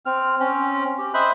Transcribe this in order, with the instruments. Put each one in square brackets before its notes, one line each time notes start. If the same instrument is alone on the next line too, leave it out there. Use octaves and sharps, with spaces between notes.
[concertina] C4 F6
C4 C#4
G4
C5 D#5 E5 B5 F#6